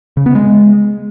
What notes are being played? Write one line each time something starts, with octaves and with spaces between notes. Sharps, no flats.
C#3
B3
G#3